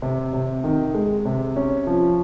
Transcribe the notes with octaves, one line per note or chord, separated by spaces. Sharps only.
C3
C3
D#3
G#3
C3
C#4
F3